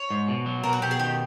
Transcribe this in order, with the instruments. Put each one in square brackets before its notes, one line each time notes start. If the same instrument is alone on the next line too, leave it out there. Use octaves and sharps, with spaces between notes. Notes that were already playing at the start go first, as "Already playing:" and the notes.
Already playing: [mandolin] C#5
[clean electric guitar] G#2
B2
F#3
[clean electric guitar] B2 [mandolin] A#4
[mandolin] F#4
[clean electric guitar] B2 [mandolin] G4
[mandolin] G#4
[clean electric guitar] D#3 [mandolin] G4